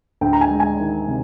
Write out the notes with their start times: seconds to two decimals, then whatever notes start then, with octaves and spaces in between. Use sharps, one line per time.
0.21 D2 G5
0.33 A#5
0.41 G#5
0.50 G#3
0.60 G#5
0.80 D#3
1.08 C3